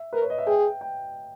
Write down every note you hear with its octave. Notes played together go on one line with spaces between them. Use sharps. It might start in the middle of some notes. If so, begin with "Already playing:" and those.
Already playing: E5
A#4 B4
C#5
D#5
E5
G#4 G5
G5